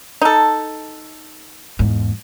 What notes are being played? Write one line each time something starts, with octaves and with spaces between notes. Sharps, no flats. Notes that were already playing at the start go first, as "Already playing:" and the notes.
D#4 A4
E2 G#2